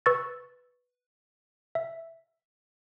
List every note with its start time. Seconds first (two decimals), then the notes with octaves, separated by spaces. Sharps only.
0.06 B4 C#6 E6 A6
1.75 E5